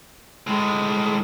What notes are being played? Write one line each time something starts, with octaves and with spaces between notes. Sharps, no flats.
A2 G#3